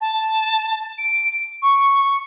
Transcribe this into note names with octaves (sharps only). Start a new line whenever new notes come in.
A5
D7
C#6